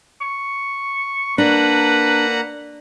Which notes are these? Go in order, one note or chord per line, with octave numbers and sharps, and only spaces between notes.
C#6
A#3 D4 B4 F#5 A#5